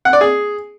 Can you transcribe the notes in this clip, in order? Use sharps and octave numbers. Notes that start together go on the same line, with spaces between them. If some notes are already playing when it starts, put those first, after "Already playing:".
F#5
D5
G#4